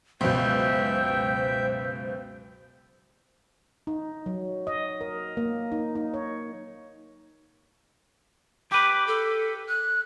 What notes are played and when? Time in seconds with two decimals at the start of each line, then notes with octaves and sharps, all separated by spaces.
0.21 C#2 F#2 B2 C5 E5 G5
3.87 D#4
4.26 F#3
4.67 D#5
5.01 A#4
5.37 A#3
5.72 D#4
5.95 D#4
6.14 C#5
8.72 G4 B4 D6
9.07 A4
9.68 F#6